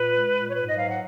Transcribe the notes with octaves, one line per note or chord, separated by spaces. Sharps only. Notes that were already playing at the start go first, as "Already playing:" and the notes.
Already playing: A#2 B4
G#3
A#2
C#5
G#2 B4
D#5
F#3 F5
F#5